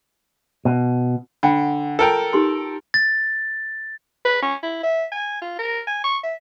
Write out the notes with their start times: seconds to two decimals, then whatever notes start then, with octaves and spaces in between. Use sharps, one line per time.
0.65 B2
1.43 D3 F#5 G5 B5
1.99 F4 A4 A#4 G5
2.33 D#4 G4 C6
2.94 A6
4.25 B4
4.43 C#4
4.63 E4
4.83 E5
5.12 G#5
5.42 F4
5.59 A#4
5.87 G#5
6.04 C#6
6.23 E5